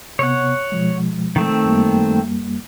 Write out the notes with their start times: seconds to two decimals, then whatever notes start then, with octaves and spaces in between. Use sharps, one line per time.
0.19 C3 B3 C#5 F#5
0.72 B2 F3 G#3
1.36 D#3 A3 C4
1.64 F#2 G3 A#3